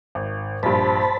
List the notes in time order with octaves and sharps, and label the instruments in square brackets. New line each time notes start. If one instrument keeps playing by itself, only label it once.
[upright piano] G#1
[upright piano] A#1 G2 [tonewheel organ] C5 A5 B5